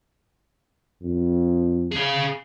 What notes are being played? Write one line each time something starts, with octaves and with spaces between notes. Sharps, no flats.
F2
G#4 F5